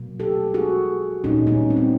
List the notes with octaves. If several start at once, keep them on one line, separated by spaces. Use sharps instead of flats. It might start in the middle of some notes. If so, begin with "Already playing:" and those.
Already playing: B2 F#3 A#3
G4 A4
F#4 G#4
A#2 G3 A#3 C#4 D#4
B3 C#4
C4
C#4